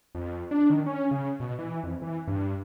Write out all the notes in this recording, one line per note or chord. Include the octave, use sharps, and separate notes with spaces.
F2
D4
D#3
C#4
C#3
B2
E3
F2
E3
G2